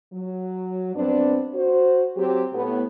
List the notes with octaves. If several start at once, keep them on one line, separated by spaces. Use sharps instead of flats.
F#3
G2 B3 C4 D4
F#4 C5
F#3 C4 G4
A2 B3